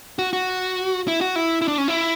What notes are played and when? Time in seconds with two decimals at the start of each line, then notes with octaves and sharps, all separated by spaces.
0.19 F#4
0.33 F#4
1.08 E4
1.21 F#4
1.36 E4
1.62 E4
1.68 D4
1.78 C#4
1.88 E4